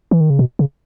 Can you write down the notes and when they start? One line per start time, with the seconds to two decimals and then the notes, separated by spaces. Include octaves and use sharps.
0.11 E3
0.21 D#3
0.30 C#3
0.39 B2
0.59 C#3